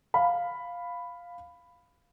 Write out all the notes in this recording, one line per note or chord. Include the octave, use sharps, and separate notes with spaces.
F5 B5